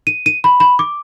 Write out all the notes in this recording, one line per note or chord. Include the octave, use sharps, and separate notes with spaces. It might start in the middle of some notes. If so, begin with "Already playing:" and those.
D#7
D#7
B5
B5
D6